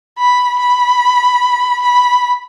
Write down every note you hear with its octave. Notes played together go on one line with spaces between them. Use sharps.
B5
B5
B5